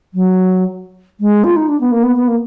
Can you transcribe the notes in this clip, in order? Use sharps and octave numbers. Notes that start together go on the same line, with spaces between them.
F#3
G#3
F4
D#4
D4
B3
A#3
B3
B3
A#3